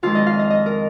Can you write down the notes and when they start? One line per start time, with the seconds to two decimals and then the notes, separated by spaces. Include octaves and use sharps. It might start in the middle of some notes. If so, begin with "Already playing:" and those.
0.03 F2 D#3 G#3 F4
0.15 D#5
0.27 F5
0.39 D#5
0.50 D#5
0.66 A#4